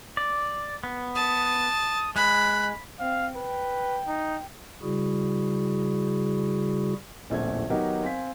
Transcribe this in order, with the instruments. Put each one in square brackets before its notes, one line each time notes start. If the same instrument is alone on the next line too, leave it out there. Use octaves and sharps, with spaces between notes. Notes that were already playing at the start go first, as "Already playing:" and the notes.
[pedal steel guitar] D5
B3
[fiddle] A5 [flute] D#6
[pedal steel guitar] G#3 [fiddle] B5 [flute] F#6
[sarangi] C4 [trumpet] F5
[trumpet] B4 [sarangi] G5
[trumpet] D#4
[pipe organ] C#3 G3 E4 F#4 G#4
[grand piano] D1 A#1 E2 A3 C#4 G#6
D#3 F#3 B3 D#4 G4 A#4
C4 F5 G#5 B6